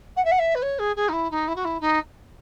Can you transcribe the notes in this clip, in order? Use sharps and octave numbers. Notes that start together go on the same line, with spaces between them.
F#5
E5
F#5
E5
B4
C#5
G#4
G#4
D#4
E4
D#4
E4
F#4
E4
D#4